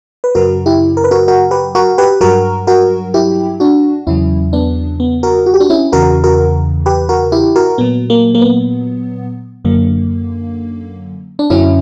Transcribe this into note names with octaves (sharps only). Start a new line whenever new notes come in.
B4
F#2 C#3 F#3 F#4 A#4
E4 G4
A#4
B4
F#4 A#4
F#4 A#4
G4 B4
F#4 A#4
G4 B4
G2 F#3 F#4 A#4
F#4 A#4
E4 G4
D4 F#4
E2 C#3 F#3 C#4 E4
B3 D4
B3
F#4 A#4
F#4
G4
D4 F#4
C#4 E4
E2 C#3 E3 F#4 A#4
F#4 A#4
G4 B4
F#4 A#4
E4 G4
F#4 A#4
A#2 F#3 B3
A#3
A#3
B3
F#2 D3 F#3 A#3
D4
F#2 D3 F#3 C#4 E4